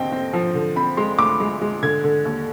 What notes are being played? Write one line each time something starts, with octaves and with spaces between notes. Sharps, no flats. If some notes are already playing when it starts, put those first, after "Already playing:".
Already playing: D#2 D3 C4 D#5 G5
C4
F3
D3
C4 B5
G#3 C6
D2 D6
G#3
G#3
D3 G#6
D3
D#2